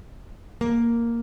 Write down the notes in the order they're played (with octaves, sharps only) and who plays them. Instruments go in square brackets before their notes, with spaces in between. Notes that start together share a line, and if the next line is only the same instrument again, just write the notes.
[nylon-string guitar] A#3